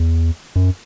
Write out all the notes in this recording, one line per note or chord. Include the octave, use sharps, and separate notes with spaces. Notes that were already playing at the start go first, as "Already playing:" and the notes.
Already playing: E2
F#2